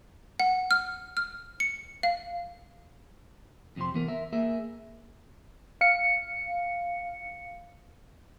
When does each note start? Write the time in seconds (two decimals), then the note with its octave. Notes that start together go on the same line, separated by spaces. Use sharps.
0.40 F#5
0.71 F6
1.17 F6
1.60 C#7
2.03 F5
3.76 F2 C3 F3 C4 C6
3.94 E3 B3 A#4
4.08 A#4 E5
4.33 A#3 G#4 A#4 E5
5.81 F5 C#7